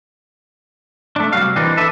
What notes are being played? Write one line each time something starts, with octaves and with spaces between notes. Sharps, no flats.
A3 D4
C2 F#3 G3 F#4 F5
E3 A#3 C4 D4 D#4
D4 A4 B4 E5